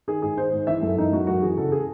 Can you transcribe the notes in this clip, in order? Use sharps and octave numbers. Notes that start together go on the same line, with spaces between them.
D#3 G#4
G#2 G#4
D#3 C5
G#2
E3 E5
F#2 A4
E3 D#4
F#2 F#4
F#2 F#4
E3 G#4
C#3 A4
G#4